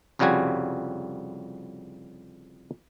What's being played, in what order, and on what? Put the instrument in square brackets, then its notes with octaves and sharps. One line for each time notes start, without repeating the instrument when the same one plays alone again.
[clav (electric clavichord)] C2 F2 C#3 G3 F#4 G#5